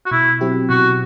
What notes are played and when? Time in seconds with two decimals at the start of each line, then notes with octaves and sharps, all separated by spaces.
0.06 F#4
0.11 B2 E4
0.41 F#3 C4 E4 G4
0.69 B2 F#4